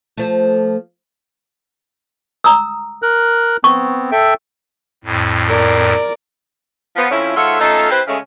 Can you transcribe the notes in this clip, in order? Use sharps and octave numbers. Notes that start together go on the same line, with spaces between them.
F3 A3
A#5 D#6 E6
A#4 F#6
B3 C4 C#6
A4 E5 G5
F2 A2
A#4 D5
F3 B3
F2 F3 C#4 E4
G#2 F4 A4 C#5 E5 F#5
A3 C#4 D#4 F4 A4
C4 E4 G4 B4 C5
C#3 G#3 A3 C#4